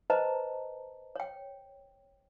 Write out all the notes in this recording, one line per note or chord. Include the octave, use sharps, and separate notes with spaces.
B4 C5 D#5 A5 A#5
C#5 G5